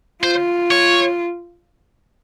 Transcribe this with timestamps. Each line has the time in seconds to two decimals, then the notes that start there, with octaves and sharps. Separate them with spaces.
0.23 F4 C5
0.71 C#5